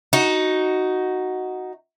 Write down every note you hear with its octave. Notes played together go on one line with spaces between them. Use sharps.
D#4 F#4